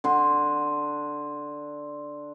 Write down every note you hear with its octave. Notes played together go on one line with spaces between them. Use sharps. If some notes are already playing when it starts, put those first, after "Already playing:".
D3 C6